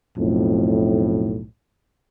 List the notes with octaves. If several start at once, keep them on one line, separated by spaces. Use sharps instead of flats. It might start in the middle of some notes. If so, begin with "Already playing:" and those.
B1 F2 A2